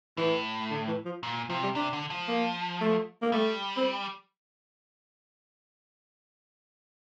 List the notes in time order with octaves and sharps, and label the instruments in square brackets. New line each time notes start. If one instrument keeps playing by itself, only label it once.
[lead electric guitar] A2 [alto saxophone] E3
[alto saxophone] D3
E3
F3
[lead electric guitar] A#2
[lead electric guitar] C3 [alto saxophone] F3
[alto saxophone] G3
[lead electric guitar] C3 [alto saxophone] D4
[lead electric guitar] D3
F3
[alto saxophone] A#3
A3
A#3
[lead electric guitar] G3 [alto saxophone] A3
[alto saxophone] C4